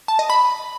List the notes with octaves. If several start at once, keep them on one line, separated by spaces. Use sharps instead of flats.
A5
D#5
B5